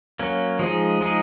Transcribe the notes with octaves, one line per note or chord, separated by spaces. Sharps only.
F#3 A#3 C#4
F3 G#3 D#4 G#4
F3 G#3 D#4 G#4